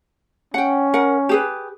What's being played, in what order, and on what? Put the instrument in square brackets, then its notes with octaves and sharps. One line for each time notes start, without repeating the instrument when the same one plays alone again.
[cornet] C#4 [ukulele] F#5 G5
[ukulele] A#4 F#5
G4 G#4 B4